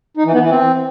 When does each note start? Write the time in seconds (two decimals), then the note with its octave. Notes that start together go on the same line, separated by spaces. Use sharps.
0.17 D#4
0.25 E3
0.34 B3
0.42 E3
0.50 C4